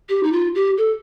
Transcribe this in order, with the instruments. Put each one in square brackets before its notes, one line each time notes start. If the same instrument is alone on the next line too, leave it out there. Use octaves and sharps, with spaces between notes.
[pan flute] G4
D#4
F4
G4
A4